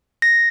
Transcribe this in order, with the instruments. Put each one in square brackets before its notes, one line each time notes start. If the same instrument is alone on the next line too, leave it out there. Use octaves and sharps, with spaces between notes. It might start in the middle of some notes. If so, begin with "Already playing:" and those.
[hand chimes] A#6